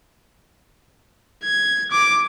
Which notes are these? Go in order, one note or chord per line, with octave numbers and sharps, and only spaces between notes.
G#6
D6